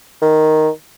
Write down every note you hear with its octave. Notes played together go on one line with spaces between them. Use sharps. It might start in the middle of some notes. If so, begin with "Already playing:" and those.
D#3